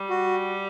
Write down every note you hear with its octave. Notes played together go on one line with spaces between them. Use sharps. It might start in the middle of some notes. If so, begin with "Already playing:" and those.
Already playing: G3
F#4